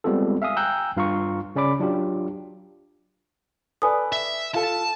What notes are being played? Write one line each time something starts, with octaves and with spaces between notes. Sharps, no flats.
G3 G#3 B3 C4 F4 A4
E5 F5 G#5 D#6
G5 G#5 A#5 E6 F#6 G6
G2 F4 F5 A#5 C6 C#6
C#3 C#4 D5 B5 D6
F#3 D4 F4 G4
A4 B4 D5 G#5 D#6
E5
F4 A4 A5